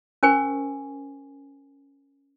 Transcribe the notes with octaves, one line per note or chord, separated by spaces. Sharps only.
C#4 A#4 C5 G5 G#5 C#6